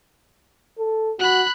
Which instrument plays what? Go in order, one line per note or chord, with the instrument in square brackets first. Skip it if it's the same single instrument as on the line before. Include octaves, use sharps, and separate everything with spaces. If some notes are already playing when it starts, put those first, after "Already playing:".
[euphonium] A4
[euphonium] F#4 [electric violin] B5 F#6